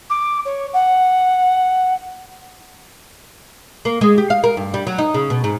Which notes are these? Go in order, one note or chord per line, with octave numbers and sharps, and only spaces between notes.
D6
C#5
F#5
A#3
G#3
G4
F5
A#4
G2
G3
F#3
D#4
C#3
B2
G#2